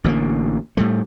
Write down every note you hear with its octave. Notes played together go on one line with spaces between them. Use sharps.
A1 D3 G#3 A#3
A2 G3 A3